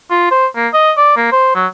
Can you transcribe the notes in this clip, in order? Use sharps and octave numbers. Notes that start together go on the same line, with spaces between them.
F4
C5
A#3
D#5
D5
A#3
C5
F#3